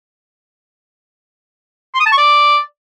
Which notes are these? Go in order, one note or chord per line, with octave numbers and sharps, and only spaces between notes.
C6
D#6
A5
C#6
D5